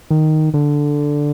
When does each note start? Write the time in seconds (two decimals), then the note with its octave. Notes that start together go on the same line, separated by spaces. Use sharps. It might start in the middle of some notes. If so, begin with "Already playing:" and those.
0.10 D#3
0.54 D3